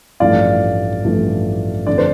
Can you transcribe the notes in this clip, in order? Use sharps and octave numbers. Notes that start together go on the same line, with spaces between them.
A1 G2 F3 A3 D5 F5
A1 G2 F3 A3
F2 D3 A3 D5
C5